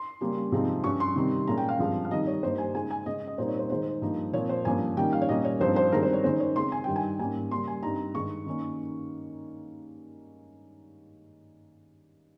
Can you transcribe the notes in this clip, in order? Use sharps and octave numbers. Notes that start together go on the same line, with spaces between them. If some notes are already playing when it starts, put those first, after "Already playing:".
Already playing: C6
C#3 G3 A#3 C#4
C3 F3 G#3 C4 D#4
G2 G3 C#4 C#6
C6
C3 D#3 G3 C4
A#2 G#3 C#4 A#5
G5
F5
G2 F3 G#3 C4
F5
D#3 G3 C4 D#4 D#5
C#5
G2 G3 A#3 D#4 C5
G#5
C#3 G#3 D#4 G#5
G#5
C#3 G#3 C#4 D#5
D#5
A#2 G3 C4 D#4 C5
C#5
C5
D#3 G#3 D#4 C5
G2 F3 A#3 D#4
A#2 F3 C4 C#5
C5
G2 F3 A#3 C#4 G#5
D#3 G3 A#3 C#4 G5
F5
C#5
A#2 G3 A#3 C#4 D#5
C#5
G2 F3 C4 D#4 C5
C5
G2 D#3 G#3 C4 A#4
C5
C#5
D#3 G#3 C#4 C5
C#5
C#3 G#3 C4 C6
G#5
G2 D#3 G3 G5
G#5
G#2 G3 A#3 C#4 G#5
C#3 G3 A#3 C#4 C6
G#5
G2 G3 C4 D#4 A#5
G2 D#3 G#3 C#6
D#3 A#3 C#4